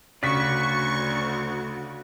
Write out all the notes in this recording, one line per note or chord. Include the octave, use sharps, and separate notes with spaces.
D2 C#3 F#4 D5 C#6 B6